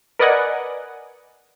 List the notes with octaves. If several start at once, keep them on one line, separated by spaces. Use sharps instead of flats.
A#4 B4 D5 D#5 F#5 G#5